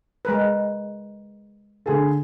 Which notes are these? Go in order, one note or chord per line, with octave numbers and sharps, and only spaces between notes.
G#3 A#4 B4
D3 G#4 A4